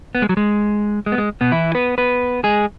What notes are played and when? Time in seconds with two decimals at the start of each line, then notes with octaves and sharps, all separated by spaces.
0.15 B3
0.22 G#3
0.29 F#3
0.37 G#3
1.06 G#3
1.12 B3
1.18 G#3
1.41 B2 B3
1.52 E3 E4
1.75 B3 B4
1.98 B3 B4
2.44 G#3 G#4